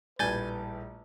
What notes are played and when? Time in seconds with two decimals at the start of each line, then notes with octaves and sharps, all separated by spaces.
0.19 A#1 A2 G3 B4 G#5 G6 A6